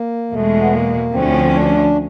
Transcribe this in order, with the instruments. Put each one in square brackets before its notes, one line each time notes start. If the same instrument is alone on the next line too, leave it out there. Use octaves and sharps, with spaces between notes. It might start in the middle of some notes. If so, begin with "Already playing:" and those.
Already playing: [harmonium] A#3
[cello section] E2 B2 G#3 [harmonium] A3
[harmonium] B3
A#3
[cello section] D2 D3 F3 A3 C#4 [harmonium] C4
[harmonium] D4